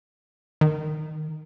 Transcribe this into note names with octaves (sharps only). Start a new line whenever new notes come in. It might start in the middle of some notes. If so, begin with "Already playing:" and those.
D#3